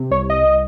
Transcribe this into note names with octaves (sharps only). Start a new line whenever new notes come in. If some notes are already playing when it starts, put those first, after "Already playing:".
Already playing: C3
C2 C#5
D#5